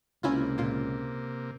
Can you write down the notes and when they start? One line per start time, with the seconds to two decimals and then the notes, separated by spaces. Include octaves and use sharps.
0.23 C#2 C3 A#3 C#4 E4 F4
0.58 A#2 F4